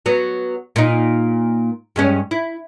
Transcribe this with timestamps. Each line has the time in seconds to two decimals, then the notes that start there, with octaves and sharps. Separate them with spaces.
0.06 F#3 B3
0.76 A#2 D#4
1.96 G2 G#3 C#4
2.31 E4